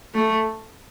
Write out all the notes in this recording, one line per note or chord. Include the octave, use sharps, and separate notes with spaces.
A3